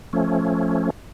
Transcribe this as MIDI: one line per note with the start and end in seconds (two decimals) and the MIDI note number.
0.13 0.90 53
0.13 0.90 57
0.13 0.90 61